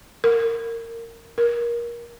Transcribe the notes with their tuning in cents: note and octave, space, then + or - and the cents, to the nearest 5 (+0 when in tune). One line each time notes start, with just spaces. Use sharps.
A#4 -20
A#4 +25